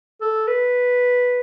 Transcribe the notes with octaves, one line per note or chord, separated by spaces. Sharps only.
A4
B4